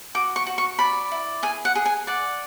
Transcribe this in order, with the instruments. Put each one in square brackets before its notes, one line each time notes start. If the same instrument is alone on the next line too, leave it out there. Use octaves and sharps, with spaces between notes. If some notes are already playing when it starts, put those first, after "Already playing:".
[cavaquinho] F#4 D6
C#6
F#4
C#6
D5 B5
E4
G#4 G#5
F#5
G#4
G#5
D5 F#5